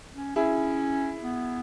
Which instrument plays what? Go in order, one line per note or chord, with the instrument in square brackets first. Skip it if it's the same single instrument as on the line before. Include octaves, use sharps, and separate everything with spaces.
[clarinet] C#4
[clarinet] C#4 [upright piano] E4 G#4
[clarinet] B3